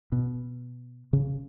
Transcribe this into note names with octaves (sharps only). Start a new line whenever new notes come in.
B2
C#3